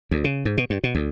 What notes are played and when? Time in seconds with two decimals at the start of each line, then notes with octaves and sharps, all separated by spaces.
0.11 D2
0.24 C#3
0.45 G#2
0.57 B2
0.70 G2
0.84 B2
0.95 D2